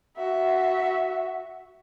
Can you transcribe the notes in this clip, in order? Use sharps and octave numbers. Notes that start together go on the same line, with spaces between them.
F#4 E5